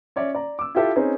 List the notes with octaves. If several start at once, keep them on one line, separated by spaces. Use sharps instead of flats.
C#4 C#5 D5 E5
D5 A#5
D6 E6
E4 F4 G4 A4 E5
C4 C#4 D#4 G#4 B4